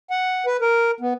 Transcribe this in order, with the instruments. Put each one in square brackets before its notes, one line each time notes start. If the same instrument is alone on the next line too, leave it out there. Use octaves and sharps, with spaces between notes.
[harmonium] F#5
B4
A#4
B3